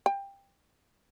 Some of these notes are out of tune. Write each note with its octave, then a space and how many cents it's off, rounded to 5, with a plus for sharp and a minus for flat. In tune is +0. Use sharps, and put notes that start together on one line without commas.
G5 +15